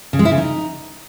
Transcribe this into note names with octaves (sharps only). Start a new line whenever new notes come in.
C#3
G#3
E4
C#3
D#4